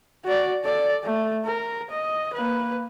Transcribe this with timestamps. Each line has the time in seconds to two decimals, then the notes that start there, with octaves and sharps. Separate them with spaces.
0.25 F#4 D5
0.64 A4 D5
1.04 A3
1.45 A#4
1.90 D#5
2.33 A#3 B4